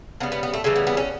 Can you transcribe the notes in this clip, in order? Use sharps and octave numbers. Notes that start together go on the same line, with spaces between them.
C#3 G3 B3
B3
B3
A3
C#3 E3 G3 A3
B3
B3
C#4